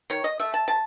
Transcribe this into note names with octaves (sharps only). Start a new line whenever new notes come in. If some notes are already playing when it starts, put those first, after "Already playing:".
D#3 C#5
D#5
A3 E5
A5
C3 A5